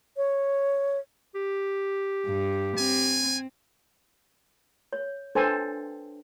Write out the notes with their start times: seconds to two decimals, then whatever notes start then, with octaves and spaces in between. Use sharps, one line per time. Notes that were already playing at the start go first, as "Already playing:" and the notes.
0.17 C#5
1.35 G4
2.26 G2
2.78 C4 G#5
4.93 C#5
5.35 D4 A4 B4 C5 G5 G#5